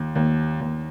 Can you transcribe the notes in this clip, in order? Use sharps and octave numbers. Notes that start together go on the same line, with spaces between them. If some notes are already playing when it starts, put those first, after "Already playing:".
Already playing: D#2
D#2
D#2